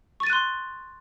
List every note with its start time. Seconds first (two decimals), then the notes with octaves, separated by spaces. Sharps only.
0.20 C#6
0.23 A6
0.27 D#7
0.30 F#6
0.33 C6